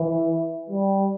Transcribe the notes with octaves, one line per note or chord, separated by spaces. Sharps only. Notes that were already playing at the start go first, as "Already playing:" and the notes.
Already playing: E3
G3